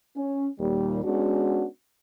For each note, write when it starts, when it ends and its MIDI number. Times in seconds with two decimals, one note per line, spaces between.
0.16 0.47 61
0.59 1.02 39
0.59 1.02 46
0.59 1.02 55
1.04 1.65 56
1.04 1.65 59
1.04 1.65 61
1.04 1.65 62
1.04 1.65 66